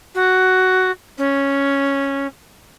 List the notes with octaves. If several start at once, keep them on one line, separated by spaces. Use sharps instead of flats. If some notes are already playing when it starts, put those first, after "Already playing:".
F#4
C#4